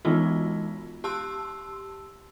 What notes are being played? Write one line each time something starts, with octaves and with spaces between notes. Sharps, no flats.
E3 G#3 B3 D#4 F4 F#4
G4 A5 C6 E6